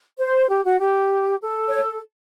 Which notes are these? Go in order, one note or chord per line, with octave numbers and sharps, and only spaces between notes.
C5
G4
F#4
G4
A4
C#5